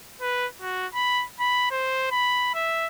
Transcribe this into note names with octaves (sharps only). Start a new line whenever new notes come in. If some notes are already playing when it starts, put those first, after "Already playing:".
B4
F#4
B5
B5
C5
B5
E5